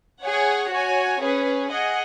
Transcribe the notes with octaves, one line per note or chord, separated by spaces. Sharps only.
G#4 C#5 F#5
F#4 C#5 G#5
C#4 G#4 B4
G#4 D#5 F#5